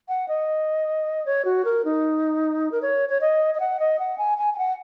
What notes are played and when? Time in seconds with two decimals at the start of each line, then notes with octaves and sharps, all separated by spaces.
0.08 F#5
0.28 D#5
1.26 C#5
1.45 F#4
1.65 A#4
1.85 D#4
2.72 A#4
2.82 C#5
3.09 C#5
3.21 D#5
3.55 D#5
3.60 F#5
3.80 D#5
3.99 F#5
4.18 G#5
4.38 G#5
4.54 G#5
4.58 F#5